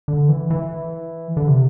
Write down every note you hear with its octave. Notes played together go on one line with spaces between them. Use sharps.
D3
E3
E3
D3
C3